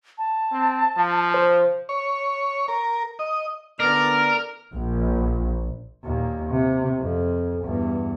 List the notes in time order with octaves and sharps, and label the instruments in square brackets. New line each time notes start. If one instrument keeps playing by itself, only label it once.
[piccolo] A5
[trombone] C4
F3
[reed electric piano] C5
[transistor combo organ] C#5
A#4
D#5
[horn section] D3 B3 D5 [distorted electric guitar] A#4 [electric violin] F6
[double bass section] A#1
[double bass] D#2 A#2
C3
F2
E2 G2